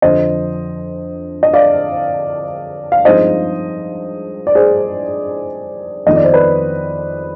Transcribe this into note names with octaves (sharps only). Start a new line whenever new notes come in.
F2 D3 F3 C5 D#5
D#5
D5 F5
F5
G2 F3 G#3 C4 D#4 C5 D#5
D5
G#4 C5
F2 D#3 B3 D#4 D#5
D5
C5
B4 D5